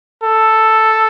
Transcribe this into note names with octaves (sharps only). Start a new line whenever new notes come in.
A4